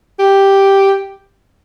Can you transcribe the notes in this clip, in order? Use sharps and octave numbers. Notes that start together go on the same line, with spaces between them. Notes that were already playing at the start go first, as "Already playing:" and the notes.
G4